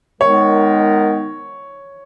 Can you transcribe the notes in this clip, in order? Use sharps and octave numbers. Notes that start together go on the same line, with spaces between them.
D#3 G#3 B3 D#4 A#4 C#5